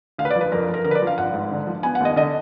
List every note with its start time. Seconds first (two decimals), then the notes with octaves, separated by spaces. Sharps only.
0.18 D2 F5
0.25 B4
0.31 D5
0.36 F3
0.41 B4
0.52 F2 A#4
0.63 A#4
0.69 F2
0.74 A#4
0.84 D3 A#4
0.91 B4
0.95 D5
1.02 F3
1.07 F5
1.18 G#1 F#5
1.34 G#2
1.51 D3
1.67 F3
1.83 B3 G#5
1.95 F#5
2.00 D#2 D#5
2.16 D3 D#5